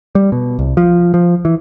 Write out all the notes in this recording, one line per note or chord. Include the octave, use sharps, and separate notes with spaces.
G3
B2
C2
F3
F3
E3